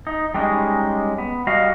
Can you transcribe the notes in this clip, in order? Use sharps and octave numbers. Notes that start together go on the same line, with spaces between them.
D#4
G3 G#3 C#4 D#4
B3
G3 F#4 D#5 F5